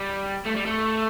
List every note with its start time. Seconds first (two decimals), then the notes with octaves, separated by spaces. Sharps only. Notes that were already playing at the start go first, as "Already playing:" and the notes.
Already playing: G3
0.46 A3
0.56 G3
0.66 A3